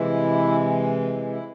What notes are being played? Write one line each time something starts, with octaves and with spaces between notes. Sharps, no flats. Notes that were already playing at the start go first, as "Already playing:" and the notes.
Already playing: C3 E3 G#3 E4
E4